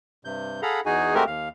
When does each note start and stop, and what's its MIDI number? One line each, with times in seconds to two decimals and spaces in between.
0.25 0.61 43
0.25 0.61 48
0.25 0.61 91
0.62 0.80 68
0.62 0.80 69
0.62 0.80 77
0.62 0.80 78
0.62 0.80 82
0.62 0.80 83
0.86 1.15 40
0.86 1.15 63
0.86 1.15 66
0.86 1.15 68
0.86 1.15 80
1.15 1.24 56
1.15 1.24 57
1.15 1.24 60
1.15 1.24 66
1.15 1.24 67
1.15 1.24 70
1.27 1.49 39
1.27 1.49 77